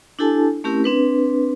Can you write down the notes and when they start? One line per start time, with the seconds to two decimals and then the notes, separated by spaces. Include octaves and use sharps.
0.19 D4 E4 G4 A4 G#5 A5
0.64 A3 C4 C#4 E4 G4 A#4
0.84 C4 D4 B4